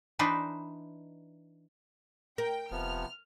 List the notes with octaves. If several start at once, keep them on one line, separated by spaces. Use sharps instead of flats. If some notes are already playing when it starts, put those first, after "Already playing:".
E3 D4 D#4 B4 C5
A#4 G5
E1 C3 F3 B3 F6